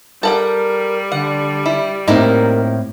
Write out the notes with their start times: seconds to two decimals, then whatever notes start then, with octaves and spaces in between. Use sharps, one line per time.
0.23 G3 A4 A#4 F#5 G5
1.12 D3 F#5
1.66 E4
2.08 A2 A#3 C4 D#4 E4 A#4 D5